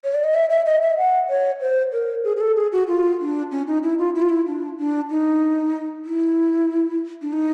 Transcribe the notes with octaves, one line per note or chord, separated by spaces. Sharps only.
C#5
D5
D#5
E5
E5
D#5
E5
F#5
C#5
C5
A#4
G#4
G#4
A4
G#4
F#4
F4
D4
C#4
D#4
E4
F4
E4
F4
E4
D4
D4
D#4
E4
D4
D#4